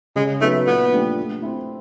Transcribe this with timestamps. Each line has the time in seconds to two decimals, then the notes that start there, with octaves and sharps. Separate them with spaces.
0.16 C#3 G#3
0.41 F#3 A3 B3 D#4
0.66 A#2 B3
0.92 F3 A3 D4 G4
1.17 A3
1.42 C4 E4